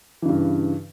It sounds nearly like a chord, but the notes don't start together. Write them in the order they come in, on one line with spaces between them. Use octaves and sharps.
E3 C#3 G2